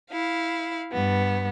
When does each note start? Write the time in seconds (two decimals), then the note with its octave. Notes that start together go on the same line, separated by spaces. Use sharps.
0.12 E4 F5
0.93 G2 B3